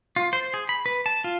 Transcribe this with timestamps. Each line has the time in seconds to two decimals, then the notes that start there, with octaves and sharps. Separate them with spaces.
0.16 F4
0.33 C5
0.54 G#4
0.69 B5
0.86 B4
1.06 A5
1.24 F4